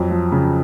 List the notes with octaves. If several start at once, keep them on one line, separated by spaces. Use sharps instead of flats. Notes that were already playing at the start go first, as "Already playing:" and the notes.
Already playing: F2 F#3
F3
C#3